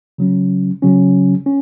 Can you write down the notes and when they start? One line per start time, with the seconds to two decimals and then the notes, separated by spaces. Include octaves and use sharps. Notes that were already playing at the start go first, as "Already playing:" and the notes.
0.18 C#3 F#3 C#4
0.82 C#3 F#3 C#4
1.46 C#4